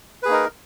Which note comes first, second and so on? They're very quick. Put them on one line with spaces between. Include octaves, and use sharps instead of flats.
B4 G#4 A#3 D#4 A#4